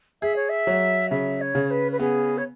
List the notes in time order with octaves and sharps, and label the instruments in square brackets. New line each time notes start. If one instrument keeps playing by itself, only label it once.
[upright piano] G#4 [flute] E5
[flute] C#5
E5
[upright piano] F#3
[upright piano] C#3 [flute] E5
[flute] C#5
[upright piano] C#3
[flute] B4
B4
[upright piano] B3 [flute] G#4
[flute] C#5